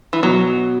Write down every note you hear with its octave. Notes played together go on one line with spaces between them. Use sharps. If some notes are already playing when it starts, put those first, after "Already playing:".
E3
B2 F#3